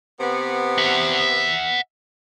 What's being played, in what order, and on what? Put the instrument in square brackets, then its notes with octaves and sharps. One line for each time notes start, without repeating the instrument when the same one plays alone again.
[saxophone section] C3 B3
[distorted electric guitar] E5 F#5